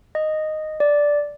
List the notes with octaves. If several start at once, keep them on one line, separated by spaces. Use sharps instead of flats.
D#5
D5